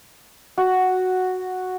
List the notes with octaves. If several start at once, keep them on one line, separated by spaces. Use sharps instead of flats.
F#4